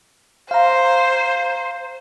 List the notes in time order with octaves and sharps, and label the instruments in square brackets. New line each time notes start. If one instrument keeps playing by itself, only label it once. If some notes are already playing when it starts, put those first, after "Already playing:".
[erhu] C5 [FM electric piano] F5 A#5